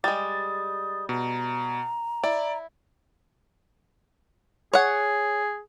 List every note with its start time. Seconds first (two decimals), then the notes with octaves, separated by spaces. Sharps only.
0.04 G3 G#3 D#6 A6
1.09 B2 A#5
2.24 E4 D5
4.73 G#4 C#5 F#5